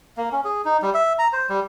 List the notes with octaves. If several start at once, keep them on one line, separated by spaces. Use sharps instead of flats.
A#3
C#4
G#4
D#4
G3
E5
A#5
C5
G3